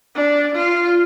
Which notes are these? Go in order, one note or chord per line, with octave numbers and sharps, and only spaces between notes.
D4
F4